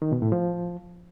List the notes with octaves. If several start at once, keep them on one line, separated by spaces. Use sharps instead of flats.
D#3
B2
A2
F3